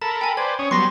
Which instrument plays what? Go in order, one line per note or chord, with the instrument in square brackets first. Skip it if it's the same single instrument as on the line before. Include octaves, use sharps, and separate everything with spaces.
[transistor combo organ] A4 A#4 B5 [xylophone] A5
[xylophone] G5 G#5
[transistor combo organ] B4 C5 D5 [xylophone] G#6
[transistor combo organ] C#4 C#5 D#6
[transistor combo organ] F#3 G3 B3 [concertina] C6 [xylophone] C#6 A#6